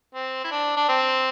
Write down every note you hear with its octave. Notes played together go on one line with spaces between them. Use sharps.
C4
E4
D4
D4
C4